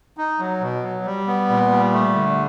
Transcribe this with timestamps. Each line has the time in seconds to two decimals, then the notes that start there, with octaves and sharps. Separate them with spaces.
0.17 D#4
0.39 F#3
0.61 B2
0.83 F#3
1.05 G3
1.27 B3
1.49 A#2
1.71 G3
1.92 A3
2.14 D3